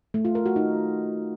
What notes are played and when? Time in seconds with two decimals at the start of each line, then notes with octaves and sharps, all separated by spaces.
0.14 A3
0.25 F4
0.35 A#4
0.46 F#4
0.56 D#4